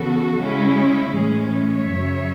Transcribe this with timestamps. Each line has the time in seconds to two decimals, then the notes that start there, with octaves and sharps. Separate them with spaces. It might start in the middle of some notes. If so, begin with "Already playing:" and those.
Already playing: C#3 E3 B3 F#4 A4
0.37 C#3 G#3 C#4 E4
1.13 A2 E3 G#3 C#4 G#4
1.51 C#5 E5
1.89 F#2 C#3 F#3